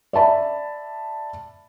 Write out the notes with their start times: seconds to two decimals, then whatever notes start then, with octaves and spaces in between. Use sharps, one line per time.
0.13 D5 E5 A5 B5